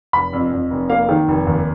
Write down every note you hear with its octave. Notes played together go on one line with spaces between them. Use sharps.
F1 B5
F2
F2
F1
A#3 F5
D#3
F1
D#2